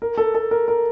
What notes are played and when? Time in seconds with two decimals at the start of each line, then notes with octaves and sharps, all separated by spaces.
0.02 A#4
0.18 A4
0.34 A4
0.51 A#4
0.68 A#4